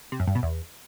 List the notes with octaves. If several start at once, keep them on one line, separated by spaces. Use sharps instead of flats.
C3
F#2
G2
B2
E2